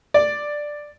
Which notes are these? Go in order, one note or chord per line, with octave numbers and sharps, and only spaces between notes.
D5